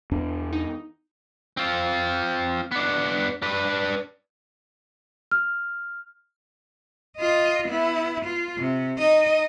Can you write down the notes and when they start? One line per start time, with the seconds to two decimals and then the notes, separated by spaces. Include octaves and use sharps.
0.11 E2 D4
0.53 D#4
1.57 C4 F4
2.72 B3 D4
3.42 D4 B4
5.31 F6
7.17 F4 D#5
7.69 B3 E4
8.25 F4
8.58 C3
8.98 D#4 D#5